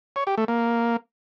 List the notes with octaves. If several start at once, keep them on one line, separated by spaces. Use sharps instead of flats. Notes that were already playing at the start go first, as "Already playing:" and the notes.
C#5
G4
A3
A#3